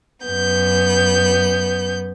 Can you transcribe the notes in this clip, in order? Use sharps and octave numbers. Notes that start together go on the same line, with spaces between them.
F#2 B3 G6